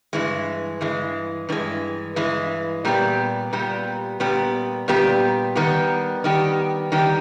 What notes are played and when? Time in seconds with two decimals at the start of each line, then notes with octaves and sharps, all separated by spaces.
0.13 G2 E3 G#3
0.81 G2 E3 G#3
1.49 G2 E3 G#3
2.16 G2 E3 G#3
2.85 A#2 G3 B3 G4
3.53 A#2 G3 B3 G4
4.20 A#2 G3 B3 G4
4.88 A#2 G3 B3 G4
5.55 D#3 G3 B3 G4
6.24 D#3 G3 B3 G4
6.92 D#3 G3 B3 G4